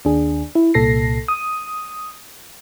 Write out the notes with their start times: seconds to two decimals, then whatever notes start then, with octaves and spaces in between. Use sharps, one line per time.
0.05 D#2 D4 G#4
0.55 E4
0.74 C2 A#2 A4 A#6 C7
1.28 D#6